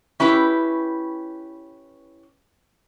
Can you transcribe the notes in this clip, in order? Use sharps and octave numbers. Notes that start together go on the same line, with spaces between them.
C#4 E4 G4 B4